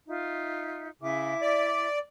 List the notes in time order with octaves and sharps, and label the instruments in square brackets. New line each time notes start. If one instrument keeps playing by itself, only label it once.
[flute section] D#4 F4 E5
[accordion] C#3 [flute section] E4 E5 D6
[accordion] D5